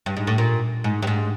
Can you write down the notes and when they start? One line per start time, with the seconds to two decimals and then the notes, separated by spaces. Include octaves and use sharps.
0.06 G2
0.17 G#2
0.27 A2
0.38 A#2
0.84 G#2
1.02 G2
1.07 G#2